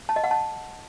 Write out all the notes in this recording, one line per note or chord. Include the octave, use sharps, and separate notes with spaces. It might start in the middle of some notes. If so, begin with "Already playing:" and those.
A5
D#5
F#5
A5